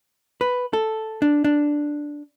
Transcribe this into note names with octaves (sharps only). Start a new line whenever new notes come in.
B4
A4
D4
D4